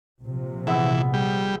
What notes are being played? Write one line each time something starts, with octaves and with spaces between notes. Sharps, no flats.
A#1 C3 F3
E3 G#3 B3 E5
G3 G#4